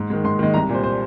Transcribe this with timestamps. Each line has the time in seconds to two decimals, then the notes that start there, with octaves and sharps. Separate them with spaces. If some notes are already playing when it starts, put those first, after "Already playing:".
Already playing: G#2
0.10 D#3 G#3
0.24 G#2 C6
0.39 D#3 G#3
0.54 C2 A#5
0.69 A#2 G3 C5
0.83 C5